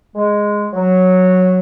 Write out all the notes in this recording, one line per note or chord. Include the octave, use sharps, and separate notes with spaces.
G#3
F#3